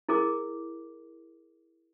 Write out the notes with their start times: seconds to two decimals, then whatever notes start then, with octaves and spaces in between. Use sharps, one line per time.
0.09 E4 G#4 A#4 D6